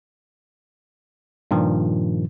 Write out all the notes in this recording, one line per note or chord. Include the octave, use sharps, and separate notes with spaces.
G2 A#2 D#3 F3